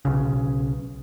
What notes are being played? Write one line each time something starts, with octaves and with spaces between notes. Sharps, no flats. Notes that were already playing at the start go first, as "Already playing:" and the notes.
B1 C#3